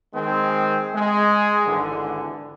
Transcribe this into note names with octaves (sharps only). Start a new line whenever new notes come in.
D#3 G#3 C4
G#3
G#1 D3 E3